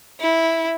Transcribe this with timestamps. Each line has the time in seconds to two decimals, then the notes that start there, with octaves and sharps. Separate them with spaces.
0.20 E4